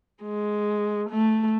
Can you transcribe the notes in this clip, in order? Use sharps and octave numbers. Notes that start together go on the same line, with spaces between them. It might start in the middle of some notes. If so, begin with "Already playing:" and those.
G#3
A3